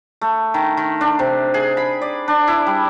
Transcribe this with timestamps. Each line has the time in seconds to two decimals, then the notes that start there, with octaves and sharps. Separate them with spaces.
0.21 A3
0.54 D#3
0.77 D#3
1.01 D4
1.19 C3
1.54 G#4
1.77 B5
2.01 D5
2.28 D4
2.48 E4
2.66 G3